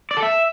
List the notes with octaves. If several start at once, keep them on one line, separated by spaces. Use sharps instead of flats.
D5
A4
E5